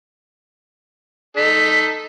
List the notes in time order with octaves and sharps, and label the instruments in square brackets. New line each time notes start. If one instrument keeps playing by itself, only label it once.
[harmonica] D#4 A4 [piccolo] B6